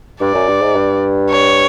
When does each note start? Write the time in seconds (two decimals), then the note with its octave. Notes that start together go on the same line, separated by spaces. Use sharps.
0.21 G2 D5
0.35 F#2
0.49 G2
0.62 G#2
0.76 G2
1.30 C#5